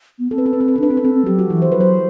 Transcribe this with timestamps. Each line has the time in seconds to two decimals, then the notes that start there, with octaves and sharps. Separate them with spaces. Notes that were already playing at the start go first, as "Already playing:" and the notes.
0.19 B3
0.31 C4 A4
0.38 B4
0.46 A4
0.53 C4 B4
0.60 A4
0.68 B4
0.76 A4
0.79 D4 B4
0.90 C4 A4
0.97 B4
1.02 C4 A4
1.15 C4
1.26 F#3 G4
1.39 F#4
1.50 E3 E4
1.62 C5
1.72 F#3 B4
1.80 C5